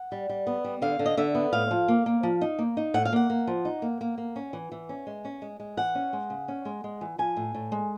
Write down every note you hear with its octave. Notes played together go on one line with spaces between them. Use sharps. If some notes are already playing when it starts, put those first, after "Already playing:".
Already playing: F#5
G3
G3
B3
G3
D3 F5
D3
D#5
D3 E5
B3
A2 F5
F3
A#3
A#3
F3
D#4
A#3
D#4
A2 F#5
F5
A#3 F#5
A#3
F3
D#4
A#3
A#3
A#3
C#4
E3
E3
C#4
G#3
C#4
G#3
G#3
E3 F#5
C#4
G#3
C#3
C#4
G#3
G#3
E3
F3 G#5
A2
A2
G#3